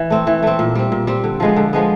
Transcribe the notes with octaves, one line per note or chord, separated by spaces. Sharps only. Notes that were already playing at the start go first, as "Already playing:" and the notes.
Already playing: E3
A3 C4
E3
A3 C4
A#2
G3 C4
A#2
G3 C4
D3
F3 G#3 B3
D3
F3 G#3 B3